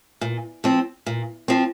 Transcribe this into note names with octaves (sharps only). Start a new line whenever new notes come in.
A#2
F3 C4
A#2
F3 C4